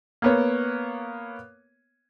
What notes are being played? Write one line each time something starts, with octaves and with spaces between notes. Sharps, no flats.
A#3 B3 C#5